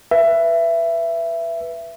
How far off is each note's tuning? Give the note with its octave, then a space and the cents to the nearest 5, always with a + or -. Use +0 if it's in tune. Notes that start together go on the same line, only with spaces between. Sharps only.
B4 -5 E5 +20